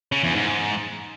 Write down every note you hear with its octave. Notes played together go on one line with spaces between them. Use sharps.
C#3
E2
G#2